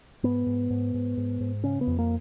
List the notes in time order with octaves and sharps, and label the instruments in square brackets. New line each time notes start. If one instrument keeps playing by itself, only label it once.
[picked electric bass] G#2 B3
G#2
G#2
G#2
G#2
G#2
C#3 C#4
B3
F2
A#3